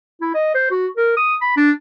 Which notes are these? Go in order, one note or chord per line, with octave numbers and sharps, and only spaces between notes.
E4
D#5
C5
F#4
A#4
D#6
B5
D4